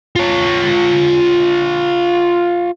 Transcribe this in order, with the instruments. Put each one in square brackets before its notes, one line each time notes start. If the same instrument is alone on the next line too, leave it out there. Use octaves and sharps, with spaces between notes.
[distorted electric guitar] F4 C#5